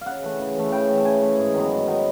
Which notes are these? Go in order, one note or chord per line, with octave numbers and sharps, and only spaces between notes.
C#3 F5 F#5
E3 A3
C#3
E3 A3
C#3 G5
E3 A3
A5
C#3 G#5
E3 A3
G#2
D#3 F#3 B3
G#2
D#3 F#3 B3